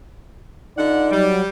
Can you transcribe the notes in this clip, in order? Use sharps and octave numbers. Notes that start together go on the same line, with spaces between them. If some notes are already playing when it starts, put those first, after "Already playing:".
D3 D#4 F4 D5 F#5
F#3 G3